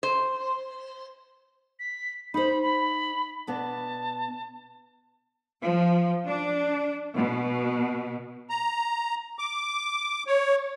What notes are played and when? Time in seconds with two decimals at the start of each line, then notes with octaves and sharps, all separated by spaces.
0.03 C5
1.79 B6
2.34 D#4 C5 B5
2.63 B5
3.47 B2 B3 D4 A5
5.63 F3
6.28 D4
7.17 B2
8.50 A#5
9.39 D6
10.27 C#5